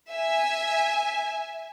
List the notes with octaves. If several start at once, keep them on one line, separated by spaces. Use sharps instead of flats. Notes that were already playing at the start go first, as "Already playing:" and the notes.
E5 G#5